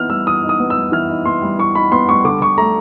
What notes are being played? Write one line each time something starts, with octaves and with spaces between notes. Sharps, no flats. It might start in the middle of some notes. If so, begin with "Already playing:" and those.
Already playing: E3 B3 D#4 F6
G3 E6
E3 D#6
D#4
D#6
B3
E6
G3
E3 F6
D#4
B3 C6
G3
E3 C#6
D#4 B5
B3 C6
G3 C#6
D3 D6
D3 C#6
A3 A#5